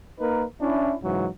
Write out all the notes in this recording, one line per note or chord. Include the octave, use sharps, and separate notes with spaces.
A#3 D#4 A#4 B4
C#4 D4 E4
G#2 C#3 E3 F#3